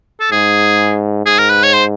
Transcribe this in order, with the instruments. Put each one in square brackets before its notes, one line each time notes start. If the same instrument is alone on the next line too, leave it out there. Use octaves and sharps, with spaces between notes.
[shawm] A4
[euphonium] G#2 [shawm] G#4
[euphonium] G#2 [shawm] G#4
[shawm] A#4
B4
C#5
C5